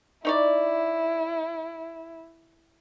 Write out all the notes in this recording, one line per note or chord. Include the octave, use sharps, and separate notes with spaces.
D#4 E4 C#5 D5